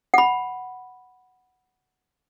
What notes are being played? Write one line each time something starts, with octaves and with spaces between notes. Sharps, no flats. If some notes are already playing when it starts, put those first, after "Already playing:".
F#5 B5